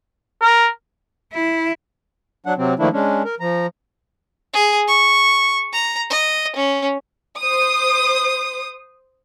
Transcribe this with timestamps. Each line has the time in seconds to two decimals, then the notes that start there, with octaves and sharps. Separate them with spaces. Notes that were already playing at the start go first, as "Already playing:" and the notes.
0.42 A#4
1.33 E4
2.46 F#3 D4 F#5
2.58 C3 F#3 C4
2.79 D#3 F3 A3 A#3 D4 E4
2.93 G#3 C#4 D4
3.25 A#4
3.40 F3 A#5
4.54 G#4
4.88 C#6
5.73 A#5
6.10 D#5
6.56 C#4
7.40 C5 D#6